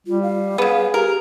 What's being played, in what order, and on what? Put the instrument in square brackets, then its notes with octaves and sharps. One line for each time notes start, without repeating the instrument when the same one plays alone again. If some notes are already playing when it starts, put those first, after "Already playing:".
[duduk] G3 [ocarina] F4
[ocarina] F5
[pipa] C#3 B3 [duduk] G#4
[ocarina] G4 [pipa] A#4
[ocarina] G4